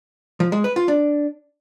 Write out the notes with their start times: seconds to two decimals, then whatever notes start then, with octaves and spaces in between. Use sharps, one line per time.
0.40 F3
0.52 G#3
0.64 B4
0.76 F4
0.88 D4